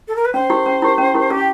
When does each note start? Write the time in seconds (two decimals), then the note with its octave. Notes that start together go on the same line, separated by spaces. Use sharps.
0.08 A4
0.16 A#4
0.25 B4
0.33 C#4 C5
0.50 E4 G4
0.66 C#4
0.82 E4 G4
0.98 C#4
1.15 E4 G4
1.30 C#4 G4